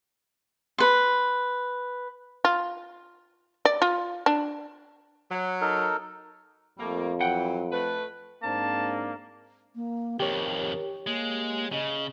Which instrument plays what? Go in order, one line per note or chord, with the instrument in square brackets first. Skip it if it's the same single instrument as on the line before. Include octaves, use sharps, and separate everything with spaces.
[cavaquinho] B4 C6
[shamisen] F4
D5
F4
D4
[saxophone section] F#3
[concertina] D#4 A4 A#4
[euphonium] F2 [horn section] G3 A3 A#3
[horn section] E3 F#3 [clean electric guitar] F#5 G5
[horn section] A3 B4
[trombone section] G#2 C4 D4 [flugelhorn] A#3 [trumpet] A5
[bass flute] A#3
[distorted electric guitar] F2 D#3 [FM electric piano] G4 C#5 [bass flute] A#4
[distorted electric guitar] G#3 [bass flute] A#3
[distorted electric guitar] C#3 [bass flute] D#5